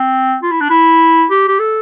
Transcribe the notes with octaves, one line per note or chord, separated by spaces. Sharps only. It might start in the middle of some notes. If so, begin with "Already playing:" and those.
Already playing: C4
F4
E4
D4
E4
G4
G4
A4